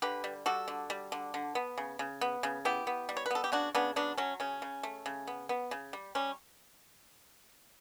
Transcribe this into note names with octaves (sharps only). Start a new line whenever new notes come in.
D3 G4 B4
G3
G3 F#4 A4
D3
G3
D3
D3
B3
C#3
C#3
B3
C#3
B3 E4 G4
B3
G3
C#5
B4
B3 A4
G4
C#3 D4 F#4
C#3 B3 D4
F#3 B3 D4
F#3 C#4
C#3 C#4
C#3
A3
C#3
B3
B3
C#3
G3
G3 C#4